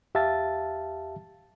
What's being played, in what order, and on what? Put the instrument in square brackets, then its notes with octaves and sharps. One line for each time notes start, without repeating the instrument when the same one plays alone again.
[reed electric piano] E2 G4 E5 F5 A5 A6